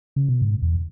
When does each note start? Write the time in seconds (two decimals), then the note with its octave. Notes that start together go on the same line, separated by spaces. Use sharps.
0.16 C#3
0.28 B2
0.42 G#2
0.62 E2